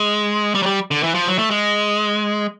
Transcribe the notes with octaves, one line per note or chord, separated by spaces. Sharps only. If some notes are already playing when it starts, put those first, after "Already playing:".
Already playing: G#3
G3
F#3
G3
D3
E3
F3
F#3
A3
G#3